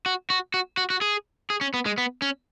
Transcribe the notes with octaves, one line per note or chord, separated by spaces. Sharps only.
F#4
F#4
F#4
F#4
F#4
G#4
G#4
C#4
B3
G#3
B3
C#4